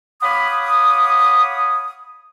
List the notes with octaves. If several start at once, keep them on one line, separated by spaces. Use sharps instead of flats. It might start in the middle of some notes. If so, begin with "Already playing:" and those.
C#5 F5 F#5 B5 D6 D#6